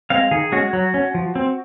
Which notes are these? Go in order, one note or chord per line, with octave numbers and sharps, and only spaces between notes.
G#3 C4 F5
D#3 G#4
G#3 C#4 F#4
F#3
C#4
F3
C4